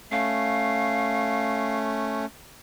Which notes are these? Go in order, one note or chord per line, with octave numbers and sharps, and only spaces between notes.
A3 C#4 F5